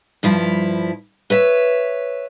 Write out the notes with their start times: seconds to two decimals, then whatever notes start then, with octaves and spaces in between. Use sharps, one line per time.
0.23 G2 F3 E4
1.30 B4 C#5 E5